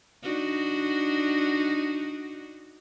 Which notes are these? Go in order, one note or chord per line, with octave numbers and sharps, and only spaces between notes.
D4 D#4 F#4